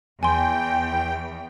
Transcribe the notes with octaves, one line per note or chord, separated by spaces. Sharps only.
E2 G5 G#5 C6